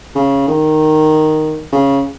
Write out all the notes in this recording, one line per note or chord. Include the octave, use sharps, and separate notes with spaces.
C#3
D#3
C#3